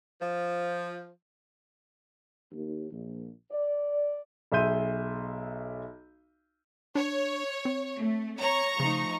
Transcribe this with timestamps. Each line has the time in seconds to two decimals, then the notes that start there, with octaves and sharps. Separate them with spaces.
0.21 F3
2.52 D#2
2.91 A#1
3.52 D5
4.52 B1 G#4 E5 C6 G6 D#7
6.95 D4 C#5
7.65 C4
7.99 A3
8.41 C#5 A#5 C#6
8.80 C#3 F3 A3 D#4